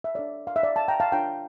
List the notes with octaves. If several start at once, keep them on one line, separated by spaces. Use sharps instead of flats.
E5
D4 A4 C#5 D5
F5
E5
D5
F5 A5
G5 A#5
F5 A5
D4 F4 A#4 C#5 G5 A#5